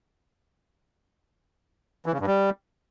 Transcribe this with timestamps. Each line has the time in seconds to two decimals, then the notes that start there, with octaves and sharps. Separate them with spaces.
2.06 E3
2.13 C#3
2.20 G2
2.27 G3